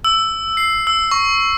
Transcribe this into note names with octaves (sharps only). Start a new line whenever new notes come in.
E6
C7
E6
C#6